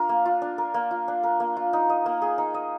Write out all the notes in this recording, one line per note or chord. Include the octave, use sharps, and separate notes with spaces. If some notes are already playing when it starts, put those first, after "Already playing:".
Already playing: D4 F4 A#4
A#3
F4
D4
A#4
A#3
F4
D4
A#4
A#3
F4
D#4
D#5
A#3
G#4
D#4
D#5